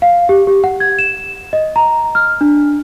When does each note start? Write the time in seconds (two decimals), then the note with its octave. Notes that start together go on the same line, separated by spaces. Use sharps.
0.02 F5
0.29 G4
0.47 G4
0.64 F#5
0.80 G#6
0.99 E7
1.53 D#5
1.76 A#5
2.15 F6
2.41 D4